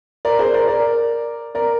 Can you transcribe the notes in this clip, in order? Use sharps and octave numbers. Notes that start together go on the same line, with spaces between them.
A#4 D5
G#4 C5
A#4 D5
A#4 D5
A#4 D5